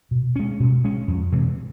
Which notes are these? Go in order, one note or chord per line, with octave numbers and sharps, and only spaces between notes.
B2
G#3 C#4
B2
G#3 C#4
F2
C3 E3 G#3